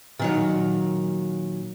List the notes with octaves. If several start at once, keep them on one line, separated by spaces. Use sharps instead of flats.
A#2 D#3 F#3